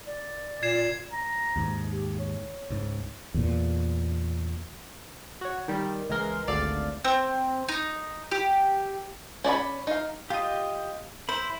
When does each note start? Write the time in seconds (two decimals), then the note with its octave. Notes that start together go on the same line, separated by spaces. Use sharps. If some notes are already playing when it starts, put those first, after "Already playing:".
0.06 D5
0.63 A#2 G#6 C7 E7
1.12 A#5
1.56 D#2 G#2
1.91 G4
2.19 C#5
2.70 C#2 G#2
3.34 E2 A#2
5.41 F#4 C#5
5.68 D#3 G3
6.10 C#2 E3 G#3 A#4 C6
6.47 G#1 D2 A4 D5 F5 A6
7.05 C4
7.69 D#4
8.31 G4
9.44 C#4 D5 E5 B5
9.87 D#4 F5
10.30 F4 G4 D#5
11.29 E4 C5 B5